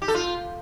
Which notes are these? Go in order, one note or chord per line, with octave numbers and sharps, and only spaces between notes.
G4
A4
F4